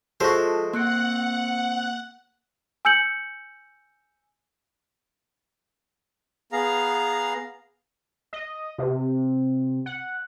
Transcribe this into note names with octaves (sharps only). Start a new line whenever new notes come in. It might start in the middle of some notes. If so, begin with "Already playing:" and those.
F3 G#3 F#4 A4 C5 E5
A#3 C4 F#5 F#6 C#7
G#5 E6 G6 C#7 F#7
B3 G#4 F5 A#5
D#5
C3
F#5